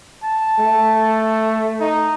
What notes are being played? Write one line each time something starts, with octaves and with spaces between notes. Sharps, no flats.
A5
A3
D#4